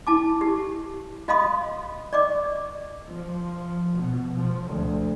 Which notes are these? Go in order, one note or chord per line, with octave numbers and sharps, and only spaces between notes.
E4 A5 D6
G4
F#4 D#5 F5 B5 C6 D#6
D5 D#5 C#6 D6
F3
B2
F3
D2